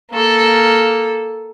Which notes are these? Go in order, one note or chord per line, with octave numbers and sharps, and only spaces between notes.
A#3 A4